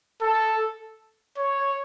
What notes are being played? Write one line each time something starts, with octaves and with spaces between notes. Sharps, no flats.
A4
C#5